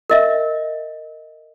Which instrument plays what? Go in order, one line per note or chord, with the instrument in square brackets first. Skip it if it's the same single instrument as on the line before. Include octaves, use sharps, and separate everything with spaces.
[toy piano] A#4 D#5 E5